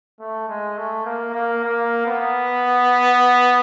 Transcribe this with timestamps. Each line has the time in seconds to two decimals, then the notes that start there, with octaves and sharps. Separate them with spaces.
0.20 A3
0.48 G#3
0.77 A3
1.05 A#3
1.34 A#3
1.64 A#3
2.06 B3